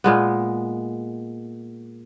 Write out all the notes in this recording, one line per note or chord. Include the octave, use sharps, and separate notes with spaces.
A#2 G#3 B3